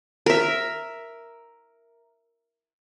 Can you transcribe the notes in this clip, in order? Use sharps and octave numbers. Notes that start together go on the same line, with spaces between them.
A#4 E5